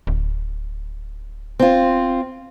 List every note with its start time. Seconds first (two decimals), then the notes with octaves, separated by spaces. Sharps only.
0.07 D1
1.59 C4 F4